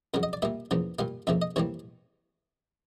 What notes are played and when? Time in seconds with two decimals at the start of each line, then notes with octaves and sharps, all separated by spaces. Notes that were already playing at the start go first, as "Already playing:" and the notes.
0.14 F2 C#3 F#3 A#4
0.23 D#5
0.33 D5
0.42 A#2 G3 A#3 E5
0.71 E2 C#3 F3 A#3
0.99 A#2 G3 A#3 F5
1.27 F2 C#3 F3 A#3 E5
1.42 D#5
1.56 C3 E3 G3 A#3 C#5